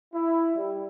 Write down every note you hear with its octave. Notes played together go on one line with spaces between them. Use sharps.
E4
G3